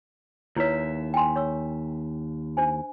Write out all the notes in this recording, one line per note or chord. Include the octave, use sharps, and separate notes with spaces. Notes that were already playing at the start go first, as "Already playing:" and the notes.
D#2 E4 B4 C#5 E5
G5 G#5 C6
C#5 C#6 E6
D4 C5 G#5